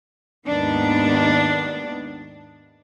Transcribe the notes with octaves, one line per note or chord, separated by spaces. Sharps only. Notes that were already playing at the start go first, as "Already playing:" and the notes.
D#2 G#2 D#3 B3 D4